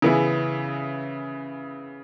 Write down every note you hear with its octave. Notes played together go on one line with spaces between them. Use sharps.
C#3 E3 B3 E4 G#4